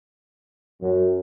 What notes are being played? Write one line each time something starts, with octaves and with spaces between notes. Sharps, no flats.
F#2